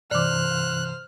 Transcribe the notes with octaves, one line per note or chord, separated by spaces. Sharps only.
G2 C3 E3 C5 D5 D6 F6 F#6